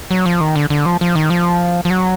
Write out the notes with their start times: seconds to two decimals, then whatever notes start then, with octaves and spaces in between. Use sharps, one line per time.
0.11 F#3
0.26 F3
0.41 D#3
0.56 D3
0.70 D3
0.86 F3
1.01 F3
1.15 D#3
1.30 F3
1.85 F3
1.90 F#3